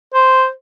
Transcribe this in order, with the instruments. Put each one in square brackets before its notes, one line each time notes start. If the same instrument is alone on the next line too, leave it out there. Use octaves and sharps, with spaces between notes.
[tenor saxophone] C5